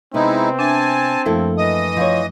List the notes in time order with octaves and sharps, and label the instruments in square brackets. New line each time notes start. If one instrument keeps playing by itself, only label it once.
[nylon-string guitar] C3 B3 [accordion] G#3 D#4 E4 [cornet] C4
[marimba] D4 E5 [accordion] G#5 A5
[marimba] F#2 F3 A3 [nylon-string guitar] A#3 E4 A4
[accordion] E3 D#5 D#6
[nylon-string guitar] F3 E4 C#5